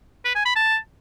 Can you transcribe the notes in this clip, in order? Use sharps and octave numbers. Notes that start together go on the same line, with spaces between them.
B4
G#5
B5
A5